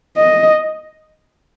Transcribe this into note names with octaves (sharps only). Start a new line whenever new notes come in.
D#5